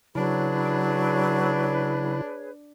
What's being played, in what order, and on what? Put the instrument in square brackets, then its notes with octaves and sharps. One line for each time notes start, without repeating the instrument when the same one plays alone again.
[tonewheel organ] C#3 E4 B5 [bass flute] F#3 [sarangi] D4 [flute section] G#4 B4 C#5